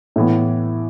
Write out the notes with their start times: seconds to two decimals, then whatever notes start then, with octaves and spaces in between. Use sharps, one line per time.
0.16 A2 E3 B3